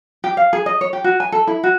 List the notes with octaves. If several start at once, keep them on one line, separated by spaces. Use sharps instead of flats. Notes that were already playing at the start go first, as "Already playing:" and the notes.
G4
F5
G#4
D#5
C#5
G4
F#4
G#5
A4
E4
F#4